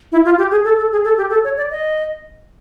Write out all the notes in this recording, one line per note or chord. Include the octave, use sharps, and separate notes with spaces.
E4
F4
G4
G#4
A4
A4
G#4
A4
G4
A4
C#5
D5
D#5